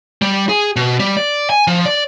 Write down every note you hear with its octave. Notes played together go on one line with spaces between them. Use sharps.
G3
G#4
B2
G3
D5
G#5
F3
D5